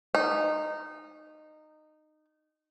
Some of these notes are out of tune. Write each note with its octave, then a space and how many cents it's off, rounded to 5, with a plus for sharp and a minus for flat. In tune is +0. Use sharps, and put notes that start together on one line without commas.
D#4 -15